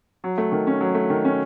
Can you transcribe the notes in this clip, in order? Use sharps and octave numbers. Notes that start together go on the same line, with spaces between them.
F#3
A3
D#3
C#4
F#3
A3
D#3
C#4